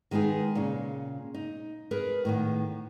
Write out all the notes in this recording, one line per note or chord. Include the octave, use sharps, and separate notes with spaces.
D#3 G#3 B3 D#4 G#4
A#2 C#3
D#4
G#4 A#4 B4
A2 D#3 B3